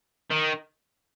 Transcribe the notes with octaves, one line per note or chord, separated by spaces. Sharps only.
D#3